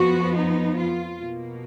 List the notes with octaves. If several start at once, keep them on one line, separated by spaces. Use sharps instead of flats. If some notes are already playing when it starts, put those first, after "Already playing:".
Already playing: F2 F3 B3 F#4
D#4
F4
B2 A#3